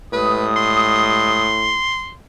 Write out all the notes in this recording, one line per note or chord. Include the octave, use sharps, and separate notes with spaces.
A2 G3 G#3 B4 D#6
C6